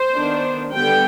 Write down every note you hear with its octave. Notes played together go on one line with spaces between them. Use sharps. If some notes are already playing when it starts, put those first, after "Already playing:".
Already playing: C5
D#3 B3 D4
D3 G3 B3 G5